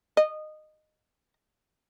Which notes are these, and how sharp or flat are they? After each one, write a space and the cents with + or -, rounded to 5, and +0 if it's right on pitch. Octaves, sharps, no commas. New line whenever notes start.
D#5 -15